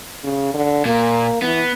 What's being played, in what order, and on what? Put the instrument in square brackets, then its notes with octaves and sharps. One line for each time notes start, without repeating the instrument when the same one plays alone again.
[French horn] C#3
D3
[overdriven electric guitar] A#2 [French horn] A#3
[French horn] E3 [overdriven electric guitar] B3